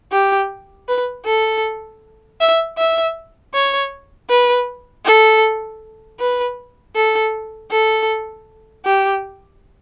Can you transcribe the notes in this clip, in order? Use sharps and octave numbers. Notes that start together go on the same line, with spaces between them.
G4
B4
A4
E5
E5
C#5
B4
A4
B4
A4
A4
G4